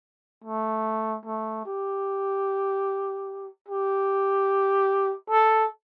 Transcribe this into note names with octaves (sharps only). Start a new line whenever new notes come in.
A3
A3
G4
G4
A4